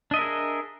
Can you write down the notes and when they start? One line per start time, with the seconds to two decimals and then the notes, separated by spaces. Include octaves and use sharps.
0.11 D4
0.14 D#5
0.16 E5
0.19 A#4
0.21 G#4